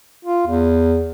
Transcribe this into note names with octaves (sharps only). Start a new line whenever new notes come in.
F4
E2